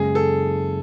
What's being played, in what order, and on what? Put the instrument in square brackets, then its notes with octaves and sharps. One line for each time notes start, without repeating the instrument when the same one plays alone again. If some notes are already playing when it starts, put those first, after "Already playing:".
Already playing: [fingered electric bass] F#2 C#3 G#3 C#4 [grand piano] G#4
[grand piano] A4